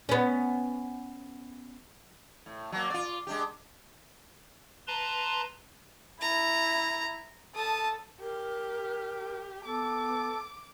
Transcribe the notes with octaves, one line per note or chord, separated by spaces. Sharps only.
B3 C#4
A2
F#3 A#3
F4 D5
G#3 D4 G4
B4 A5 A#5 C6
E4 A#5
A4 A5 D#6
G4 A#4
B3 A4 D6